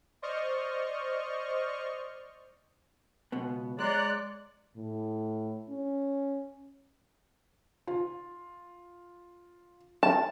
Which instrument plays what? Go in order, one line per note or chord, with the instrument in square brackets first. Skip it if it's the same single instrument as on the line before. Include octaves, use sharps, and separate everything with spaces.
[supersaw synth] C5 D5 D#5 C#6 F6
[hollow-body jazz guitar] C#2 B2 B3
[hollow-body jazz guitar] G#3 [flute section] C#5 A#5 C6 [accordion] D5 F#6
[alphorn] A2
C#4
[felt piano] F4
[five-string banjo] A5